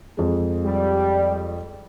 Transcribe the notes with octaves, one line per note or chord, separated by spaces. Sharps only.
F2 G#3
G3